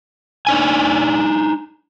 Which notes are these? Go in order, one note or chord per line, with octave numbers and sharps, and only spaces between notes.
D4 D#4 G#5